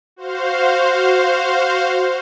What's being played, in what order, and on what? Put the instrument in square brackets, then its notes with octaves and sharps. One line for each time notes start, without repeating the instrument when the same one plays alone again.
[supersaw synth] F#4 C5 F5